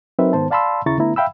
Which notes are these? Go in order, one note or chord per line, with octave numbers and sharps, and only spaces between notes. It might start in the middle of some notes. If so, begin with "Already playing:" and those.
F#3 C4 D#4 A#4 B4 E5
G#2 D#3 B3 C5 A5
D5 F5 A5 B5 C6 E6
D#2 C#3 E4 A#5 C#6 A6
D3 A3 B3 E4 A#5
E5 F5 G5 B5 E6